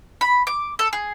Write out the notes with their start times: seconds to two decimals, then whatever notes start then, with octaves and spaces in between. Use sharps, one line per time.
0.21 B5
0.47 D6
0.79 A4
0.93 G#4